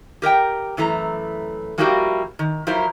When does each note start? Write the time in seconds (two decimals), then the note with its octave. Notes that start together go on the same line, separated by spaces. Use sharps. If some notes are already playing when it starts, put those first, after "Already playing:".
0.22 G4 A#4 D#5 G5
0.77 F#2 E3 A3 A#5
1.78 F3 G3 A#3 E4 F#4 G4
2.39 D#3
2.67 F3 F#3 E4 A#4 C5